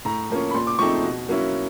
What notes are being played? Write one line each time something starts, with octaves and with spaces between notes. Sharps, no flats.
A2 A#5
F3 A#3 C#4
B5
A#2 C6
D6
F3 A3 C4 D#4 C#6
B2
F#3 A#3 C#4 E4